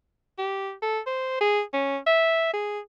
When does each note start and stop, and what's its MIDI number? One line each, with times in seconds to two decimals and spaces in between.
0.38 0.72 67
0.82 0.99 69
1.07 1.38 72
1.41 1.62 68
1.74 1.97 61
2.07 2.52 76
2.53 2.79 68